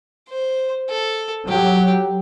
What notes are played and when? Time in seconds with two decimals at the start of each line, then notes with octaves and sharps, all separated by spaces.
0.30 C5
0.89 A4
1.48 F#3 G4